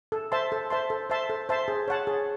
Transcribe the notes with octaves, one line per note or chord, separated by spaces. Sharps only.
A4
C5 E5 A5 C6
A4
C5 E5 A5 C6
A4
C5 E5 A5 C6
A4
C5 E5 A5 C6
G#4
C#5 F#5 A5
G#4